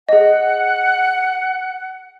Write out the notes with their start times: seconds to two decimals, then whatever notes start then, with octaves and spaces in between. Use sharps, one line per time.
0.09 G#4 D#5 F#5